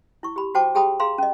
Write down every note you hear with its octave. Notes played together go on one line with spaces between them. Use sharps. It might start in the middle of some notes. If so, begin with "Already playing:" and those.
E4 C#6
G4 B5
F#4 C5 G5 A5 D6
G4 G#4 G5 A5 B5 D#6
G#4 F5 A#5 C6
C#4 D#5